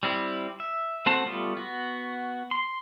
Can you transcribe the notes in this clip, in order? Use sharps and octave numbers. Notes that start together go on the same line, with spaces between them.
G3 C4 E4
E5
A3 C4 F#4 C5 A5
G3 A3 B3 F4
B3 F#4
C6